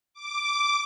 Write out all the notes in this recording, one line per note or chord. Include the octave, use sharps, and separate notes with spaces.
D6